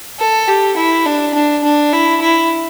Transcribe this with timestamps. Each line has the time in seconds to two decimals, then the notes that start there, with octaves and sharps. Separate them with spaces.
0.19 A4
0.48 G4
0.77 E4
1.06 D4
1.34 D4
1.64 D4
1.93 E4
2.22 E4